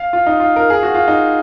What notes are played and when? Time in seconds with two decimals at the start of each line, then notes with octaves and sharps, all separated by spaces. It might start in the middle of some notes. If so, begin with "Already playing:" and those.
Already playing: F5
0.13 F4
0.27 D#4
0.40 F4
0.56 A#4
0.70 G#4
0.83 F#4
0.94 F4
1.08 D#4